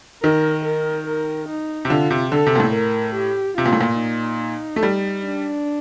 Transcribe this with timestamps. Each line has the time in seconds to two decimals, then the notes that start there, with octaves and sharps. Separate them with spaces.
0.23 D#3 A#4
0.65 A#4
1.07 A#4
1.48 D#4
1.85 C3
1.90 D3 F4
2.11 C3
2.32 D3 A4
2.47 C3
2.56 A#2
2.60 A2
2.73 A#4
3.15 G4
3.57 C3 F4
3.66 A#2
3.73 A2
3.81 A#2
3.99 D#4
4.76 A3
4.83 G3
5.25 D4